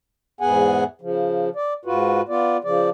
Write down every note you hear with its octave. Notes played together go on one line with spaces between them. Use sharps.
E2 G#2 B3 G#4 F#5 G#5
C#3 F3
D5
G#2 F4 F#4 B4
B3 F4 D5
C#3 F3 D5